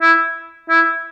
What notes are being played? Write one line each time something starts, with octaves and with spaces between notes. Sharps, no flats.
E4
E4